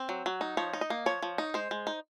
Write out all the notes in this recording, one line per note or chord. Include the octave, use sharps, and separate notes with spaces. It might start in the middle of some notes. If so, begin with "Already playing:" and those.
Already playing: C4
F#3
F#3
D#4
F3 C#5
D#4
D#5
A#3
F3 C#5
F3
D#4
G#3 C5
G#3
D#4